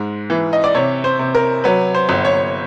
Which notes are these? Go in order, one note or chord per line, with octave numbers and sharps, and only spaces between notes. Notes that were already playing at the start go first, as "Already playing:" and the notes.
Already playing: G#2 G#3
E3
D#5
D5
C3 C#5
C5
C3
A#4
F#3 B4
C5
G1
C#5